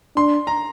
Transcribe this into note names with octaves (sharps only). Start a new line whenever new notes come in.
D4 C6
A#5